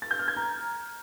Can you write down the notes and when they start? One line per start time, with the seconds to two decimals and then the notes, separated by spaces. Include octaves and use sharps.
0.02 A6
0.11 G6
0.19 F6
0.28 G#6
0.36 A#5